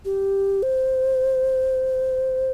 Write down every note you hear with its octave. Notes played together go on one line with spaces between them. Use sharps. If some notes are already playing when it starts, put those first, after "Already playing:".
G4
C5